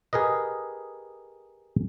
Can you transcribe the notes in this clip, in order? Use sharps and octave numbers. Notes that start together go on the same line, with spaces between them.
G4 G#4 A#4 B4 D#5